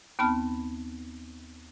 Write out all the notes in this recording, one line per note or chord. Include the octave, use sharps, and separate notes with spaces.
D#2 B3 C4 A5 B5 F6